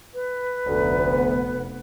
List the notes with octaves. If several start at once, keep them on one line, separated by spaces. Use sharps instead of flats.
B4
F1 D2 B3